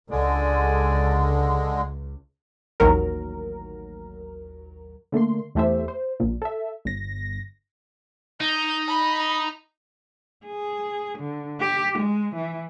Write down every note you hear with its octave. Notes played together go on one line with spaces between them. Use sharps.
C#2 D3 G#3 D5 G#5
A1 D#2 F#3 A#4
D3 A3 A#3 C6
E2 E3 A3 G4 C5 E5
C5
A#1 A#2
A4 E5
G1 A#6
D#4 G6
B5
G#4
D3
G4
G#3
E3